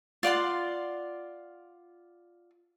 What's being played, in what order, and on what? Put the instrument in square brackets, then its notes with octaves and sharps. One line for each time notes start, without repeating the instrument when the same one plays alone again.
[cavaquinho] F4 D5 F#5 C6